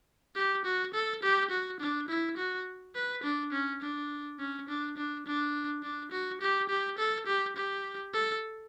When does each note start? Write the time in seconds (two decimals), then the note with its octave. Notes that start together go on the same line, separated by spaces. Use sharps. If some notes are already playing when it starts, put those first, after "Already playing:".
0.35 G4
0.65 F#4
0.94 A4
1.23 G4
1.50 F#4
1.80 D4
2.09 E4
2.37 F#4
2.95 B4
3.23 D4
3.52 C#4
3.82 D4
4.39 C#4
4.68 D4
4.97 D4
5.26 D4
5.82 D4
6.11 F#4
6.41 G4
6.69 G4
6.98 A4
7.26 G4
7.56 G4
8.13 A4